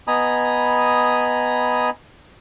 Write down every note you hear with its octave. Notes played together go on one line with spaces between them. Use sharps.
B3 D#5 G#5 A#5 B5 D#6